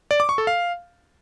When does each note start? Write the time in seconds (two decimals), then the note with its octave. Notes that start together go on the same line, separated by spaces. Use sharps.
0.11 D5
0.20 D6
0.29 C#6
0.38 A4
0.47 F5